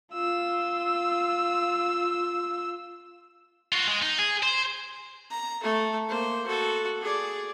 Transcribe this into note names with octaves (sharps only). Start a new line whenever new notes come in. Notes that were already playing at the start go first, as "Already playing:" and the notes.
F4 E6
F4 F#4
G#3
D#4
G#4
C5
A#5
A3 A4
A#3 C5
F#4 A4
G#4 D5